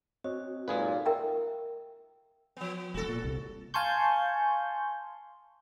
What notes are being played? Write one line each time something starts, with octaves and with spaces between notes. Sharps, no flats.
C4 F#4 C#5 D#5
A#2 F#3 G#3 D#4 F4 G#4 A4 B4
A#4 E5 G5 A#5
F3 B3
E1 F#4 A4
A#2
C2
F5 G#5 A5 C6 C#6 G6